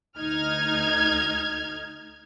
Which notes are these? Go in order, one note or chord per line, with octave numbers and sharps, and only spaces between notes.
D2 D#4 F6 G#6